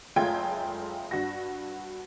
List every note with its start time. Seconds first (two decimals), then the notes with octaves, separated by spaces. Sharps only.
0.16 F#1 G#3 A3 F4 G5 G#6
1.11 G2 F#4 F#5 A#6